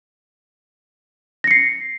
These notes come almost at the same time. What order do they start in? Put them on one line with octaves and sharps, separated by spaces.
A#6 C#7 C7